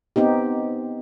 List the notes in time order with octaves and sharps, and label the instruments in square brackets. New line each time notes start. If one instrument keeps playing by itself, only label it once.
[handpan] B3 C4 D#4 G4